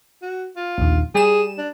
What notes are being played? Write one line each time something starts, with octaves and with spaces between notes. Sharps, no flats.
F#4
F4
A#1 D#2
G3 G#4 E7
D4